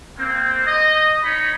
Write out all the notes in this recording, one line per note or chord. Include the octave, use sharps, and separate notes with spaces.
A#3 C4
D#5
D#4 C#5 B5